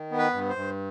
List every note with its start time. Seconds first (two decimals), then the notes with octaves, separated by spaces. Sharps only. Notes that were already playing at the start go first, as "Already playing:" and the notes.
Already playing: D#3
0.11 B3
0.18 B4
0.34 G2
0.49 C5
0.56 G2